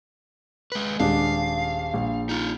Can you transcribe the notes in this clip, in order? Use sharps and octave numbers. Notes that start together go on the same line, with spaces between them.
G#3 B4
D#1 G#3 D4 F5
A#1
D#4 F4